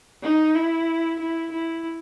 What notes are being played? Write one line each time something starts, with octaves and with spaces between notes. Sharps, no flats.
D#4
E4
E4
E4